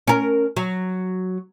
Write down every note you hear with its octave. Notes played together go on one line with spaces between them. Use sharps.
C#4 A#4
F#3